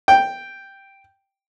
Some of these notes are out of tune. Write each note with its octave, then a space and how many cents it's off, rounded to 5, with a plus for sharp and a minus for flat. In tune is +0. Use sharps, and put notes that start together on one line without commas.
G5 +0